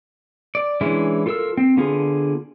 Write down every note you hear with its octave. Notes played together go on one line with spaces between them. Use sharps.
D5
E3 G#3 C#4 D4 E4
F4 A4 A#4 E6
C4
D3 B3 F4 G#4